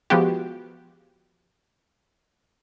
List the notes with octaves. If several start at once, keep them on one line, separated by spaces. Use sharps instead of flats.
F3 G#3 B3 F#4 G4